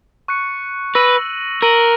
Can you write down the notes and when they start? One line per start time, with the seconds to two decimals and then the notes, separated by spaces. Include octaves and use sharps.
0.28 C#6 F#6 C#7
0.95 B4 E6 A#6 D#7 F#7
1.62 A#4 E6 A#6 D#7 F#7